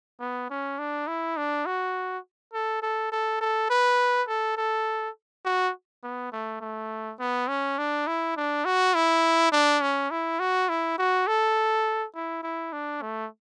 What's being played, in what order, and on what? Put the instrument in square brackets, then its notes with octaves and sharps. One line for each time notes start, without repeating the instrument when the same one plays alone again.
[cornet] B3
C#4
D4
E4
D4
F#4
A4
A4
A4
A4
B4
A4
A4
F#4
B3
A3
A3
B3
C#4
D4
E4
D4
F#4
E4
D4
C#4
E4
F#4
E4
F#4
A4
E4
E4
D4
A3